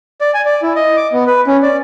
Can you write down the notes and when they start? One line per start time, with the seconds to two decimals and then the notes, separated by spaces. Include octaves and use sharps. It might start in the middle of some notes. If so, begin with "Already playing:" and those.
0.21 D5
0.34 G#5
0.46 D5
0.63 E4
0.76 D#5
0.97 D6
1.13 B3
1.27 B4
1.47 C#4
1.63 D5